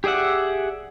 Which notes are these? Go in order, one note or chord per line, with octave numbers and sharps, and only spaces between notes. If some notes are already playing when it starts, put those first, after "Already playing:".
G4 G#4 D5 E5 F#5